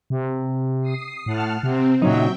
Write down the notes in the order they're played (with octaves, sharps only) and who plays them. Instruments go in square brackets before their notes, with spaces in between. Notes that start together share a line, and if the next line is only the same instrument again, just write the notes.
[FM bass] C3
[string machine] D#6 C7
[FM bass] A2 [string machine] F#5 A5 F6
[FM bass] C3 [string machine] C4
[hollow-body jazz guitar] A#2 C#3 D#4 [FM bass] F#3 [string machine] E5 G5